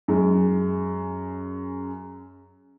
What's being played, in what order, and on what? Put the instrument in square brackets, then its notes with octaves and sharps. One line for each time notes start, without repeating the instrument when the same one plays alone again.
[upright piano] F#2 G#3